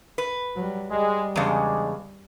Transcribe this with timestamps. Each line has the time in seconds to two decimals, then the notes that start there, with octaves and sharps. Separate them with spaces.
0.18 B4
0.56 F#3 G3
0.90 G3 G#3
1.36 E2 C#3 G#3 D4